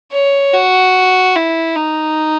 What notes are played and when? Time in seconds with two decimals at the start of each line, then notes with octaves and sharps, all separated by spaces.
0.12 C#5
0.53 F#4
1.36 E4
1.76 D#4